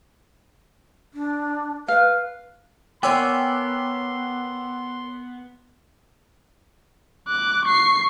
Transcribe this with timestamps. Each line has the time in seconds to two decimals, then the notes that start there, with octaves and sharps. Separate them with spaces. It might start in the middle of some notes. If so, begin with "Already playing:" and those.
1.14 D4
1.88 B4 F5
3.03 B3 A#4 C#5 G5 G#5 C6 D6 E6
7.28 D6 F#6
7.65 C#6 C7